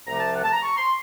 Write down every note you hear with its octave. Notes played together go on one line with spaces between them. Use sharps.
C2 C3 F3 A3 A#5
A5
F#5
A5
A#5
C#6
C6